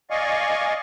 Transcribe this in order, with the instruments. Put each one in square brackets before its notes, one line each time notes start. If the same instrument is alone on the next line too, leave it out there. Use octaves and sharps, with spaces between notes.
[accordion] D5 D#5 F5 G#5 C#6